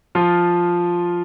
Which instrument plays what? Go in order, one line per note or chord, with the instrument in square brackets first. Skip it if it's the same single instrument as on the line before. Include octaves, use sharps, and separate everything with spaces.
[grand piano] F3 F4